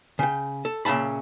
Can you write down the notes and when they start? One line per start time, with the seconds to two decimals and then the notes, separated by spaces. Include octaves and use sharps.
0.19 C#3 G5
0.65 A4
0.85 A#2 C#3 E5 A5 B5